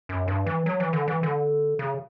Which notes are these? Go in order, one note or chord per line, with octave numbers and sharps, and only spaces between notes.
F#2
G2
E3
F#3
E3
D3
E3
D3
C#3